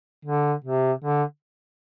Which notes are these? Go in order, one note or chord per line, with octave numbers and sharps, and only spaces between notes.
D3
C3
D3